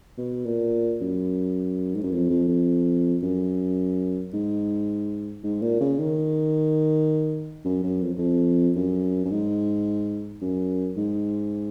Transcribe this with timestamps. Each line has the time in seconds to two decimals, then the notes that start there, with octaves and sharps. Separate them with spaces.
0.18 B2
0.46 A#2
1.01 F#2
1.95 G#2
2.03 F#2
2.12 F2
2.30 F2
2.49 F2
3.23 F#2
4.33 G#2
5.43 G#2
5.62 A#2
5.81 C#3
5.99 D#3
7.65 F#2
7.83 F#2
8.02 F2
8.18 F2
8.76 F#2
9.25 F#2
9.31 G#2
10.42 F#2
10.97 G#2